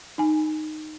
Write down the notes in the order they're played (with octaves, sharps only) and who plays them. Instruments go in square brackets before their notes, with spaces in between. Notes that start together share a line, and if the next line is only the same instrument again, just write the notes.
[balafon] D#4 G#5